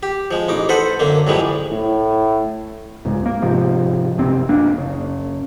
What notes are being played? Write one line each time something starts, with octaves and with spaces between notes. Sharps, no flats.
G4
F3 G#3
A1 D#4 D6
A4 B4 C5 F#5
F#2 D3 A#3
F#2 A2 E3 F3 G3 G#3
A2
D1 C#2 G#2
A#3
G#2 C3 F3
F#1 B1 C3 C4
F#1 A#3 D4
F#1 C#3